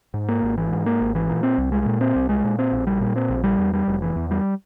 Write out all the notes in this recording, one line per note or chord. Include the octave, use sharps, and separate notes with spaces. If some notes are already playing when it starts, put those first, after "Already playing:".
G#2
A#3
G#1
E3
G#2
A#3
G#1
E3
A#2
C4
C2
G#3
A#2
C4
C2
G#3
A#2
C4
A#1
G3
A#2
C4
A#1
G3
E2
G3
F1
E3
E2
G3